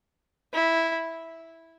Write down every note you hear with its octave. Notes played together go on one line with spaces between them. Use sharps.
E4